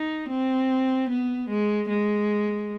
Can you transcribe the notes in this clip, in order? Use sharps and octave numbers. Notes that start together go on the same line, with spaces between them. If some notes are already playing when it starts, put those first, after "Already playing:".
Already playing: D#4
C4
B3
G#3
G#3